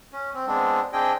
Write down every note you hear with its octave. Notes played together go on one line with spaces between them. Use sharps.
C#4
C4
G#3 B3 C4 D4
C4 D4 G#4 D#5 G5